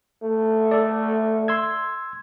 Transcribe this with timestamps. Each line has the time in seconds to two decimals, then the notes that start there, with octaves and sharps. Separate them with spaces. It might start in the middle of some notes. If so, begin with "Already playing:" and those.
0.23 A3
0.71 A4 D5
1.48 C6 E6 G#6